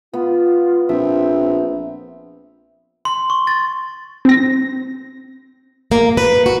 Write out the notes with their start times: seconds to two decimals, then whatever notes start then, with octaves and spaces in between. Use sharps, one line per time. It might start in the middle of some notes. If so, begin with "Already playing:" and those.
0.13 B3 F4
0.89 A#1 C4 E5
3.05 C6
3.30 C#6
3.47 A6
4.25 C4 A#6
5.92 A#3
6.17 B4
6.46 F#4